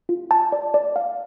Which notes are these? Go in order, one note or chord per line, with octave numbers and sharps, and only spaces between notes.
F4
A5
D5
D5
F5